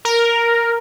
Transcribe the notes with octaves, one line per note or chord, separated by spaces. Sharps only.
A#4